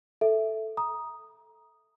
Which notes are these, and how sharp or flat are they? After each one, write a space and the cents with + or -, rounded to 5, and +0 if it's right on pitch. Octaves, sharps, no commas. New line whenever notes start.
A4 +0 E5 +0
A#5 +20 D#6 +0